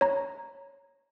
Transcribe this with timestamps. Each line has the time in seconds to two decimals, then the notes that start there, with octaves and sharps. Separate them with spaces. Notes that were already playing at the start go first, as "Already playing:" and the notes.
0.01 C#5 A#5